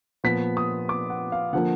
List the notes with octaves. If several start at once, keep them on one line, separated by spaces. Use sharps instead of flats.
A#2 F3 B3 B6
D#6
D6
F#5
F5
D3 F3 A#3 F#5